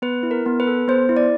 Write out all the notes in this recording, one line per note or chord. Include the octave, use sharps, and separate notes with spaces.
B3 B4
E4
A#4
B3
B4
A4
B3 C5
E4
D5